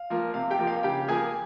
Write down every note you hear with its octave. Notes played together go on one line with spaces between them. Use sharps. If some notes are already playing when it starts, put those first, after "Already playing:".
Already playing: F5
F3 A#3
C3 F5
G4 G5
F3 A#3
F5
C#3 G4 G5
F3 A#3 G#4 G#5